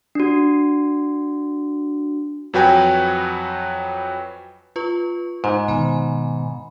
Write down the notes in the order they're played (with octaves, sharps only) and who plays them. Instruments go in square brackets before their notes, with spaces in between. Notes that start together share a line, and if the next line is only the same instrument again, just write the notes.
[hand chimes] D4 F#4
[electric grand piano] F2 F#3 F#4 B4 G5 G#5
[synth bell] F4 B4 C#6
[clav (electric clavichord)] G#2 [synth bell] D#4 C5
[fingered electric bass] B2 D#3 [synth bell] G#5 B5